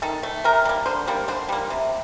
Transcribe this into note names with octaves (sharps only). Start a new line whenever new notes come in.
D#3 A4
A3
C3 A#4
G3 A#3
D3 C5
G3 A#3
D3 C5
G3 A#3
C3